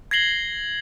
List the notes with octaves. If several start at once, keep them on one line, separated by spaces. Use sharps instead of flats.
G#6 A#6 C7 F#7 G7